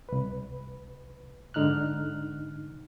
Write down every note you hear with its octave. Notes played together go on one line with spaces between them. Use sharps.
C2 B4
G#2 D3 D#4 F6 F#6